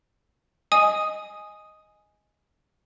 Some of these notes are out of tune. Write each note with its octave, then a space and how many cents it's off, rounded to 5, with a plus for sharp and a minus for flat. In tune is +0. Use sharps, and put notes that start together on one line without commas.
D#5 +0 G#5 +0 D#6 +0